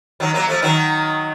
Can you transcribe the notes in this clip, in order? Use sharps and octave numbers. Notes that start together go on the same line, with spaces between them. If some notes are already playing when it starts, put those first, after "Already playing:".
D#3 F#3
F#3 A#3
F3 A3
D#3 F#3